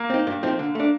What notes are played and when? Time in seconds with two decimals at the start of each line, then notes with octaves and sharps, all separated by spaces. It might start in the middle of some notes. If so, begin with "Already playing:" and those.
Already playing: A#3
0.10 C4 D#4
0.27 G2
0.43 F3 A3 C4 D#4
0.59 D3
0.75 A3 D4